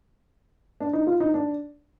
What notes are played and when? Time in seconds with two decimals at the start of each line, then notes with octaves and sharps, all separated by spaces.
0.80 D4
0.93 D#4
1.07 F4
1.20 D#4
1.34 D4